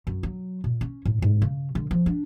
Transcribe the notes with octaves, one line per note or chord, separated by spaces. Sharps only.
F#2
F#3
A#2
C#4
A2
G#2
C#3
D3
F3
D4